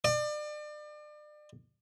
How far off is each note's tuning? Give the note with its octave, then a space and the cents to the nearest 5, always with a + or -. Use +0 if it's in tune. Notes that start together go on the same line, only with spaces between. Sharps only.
D5 +35